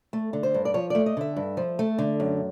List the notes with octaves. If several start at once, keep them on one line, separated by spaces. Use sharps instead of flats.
A3
D3
C5
G2
D5
F3 C#5
A3 D5
D#5
D3 E5
G2
F3
A3
D3
F#2